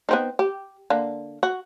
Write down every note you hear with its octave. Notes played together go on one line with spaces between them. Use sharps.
B3 C4 D#4
G4
D3 A#3
F#4